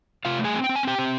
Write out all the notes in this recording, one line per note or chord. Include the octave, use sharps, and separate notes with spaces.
C3 F4 F5
A3
G#4 G#5
C4
G5
C4
G#5
C4 G4 G5
C4